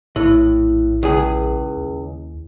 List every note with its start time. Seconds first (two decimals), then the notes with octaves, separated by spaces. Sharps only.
0.16 A#1 A2 E4
1.03 C#2 G#4
1.77 D#2